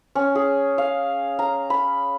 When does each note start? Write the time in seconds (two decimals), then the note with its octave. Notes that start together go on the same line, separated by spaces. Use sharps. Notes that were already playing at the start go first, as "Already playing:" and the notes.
0.15 C#4
0.35 G#4
0.78 F5
1.39 A#5
1.70 B5